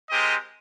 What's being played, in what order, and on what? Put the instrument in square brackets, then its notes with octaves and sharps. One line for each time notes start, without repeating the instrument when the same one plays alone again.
[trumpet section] G#3 C4 G4 A#4 D#5